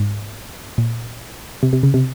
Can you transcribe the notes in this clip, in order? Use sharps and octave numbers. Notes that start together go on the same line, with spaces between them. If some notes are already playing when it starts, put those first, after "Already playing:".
Already playing: G#2
A#2
C3
C3
C#3
C3